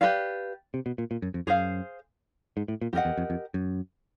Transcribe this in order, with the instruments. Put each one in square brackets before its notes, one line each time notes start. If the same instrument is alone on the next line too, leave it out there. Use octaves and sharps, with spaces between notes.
[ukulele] G4 B4 D5 F5
[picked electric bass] C3
B2
A#2
A#2
F#2
F2
[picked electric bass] F#2 [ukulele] G#4 C5 F5
[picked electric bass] G#2
A2
A#2
[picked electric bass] F2 [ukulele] G4 A#4 D#5 F#5
[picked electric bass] E2
F2
F2
F#2